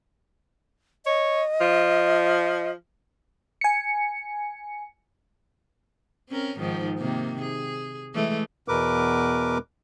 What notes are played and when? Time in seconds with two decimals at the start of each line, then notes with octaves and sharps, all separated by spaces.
1.06 C#5 D#5
1.61 F3
3.61 G#5 C#7
6.29 C4 C#4 A#4
6.59 G#2 D#3 F3
6.99 C3 D#3 A#3
7.41 G#4
8.14 E3 G#3 A3
8.68 E2 B2 A#4 B4 D6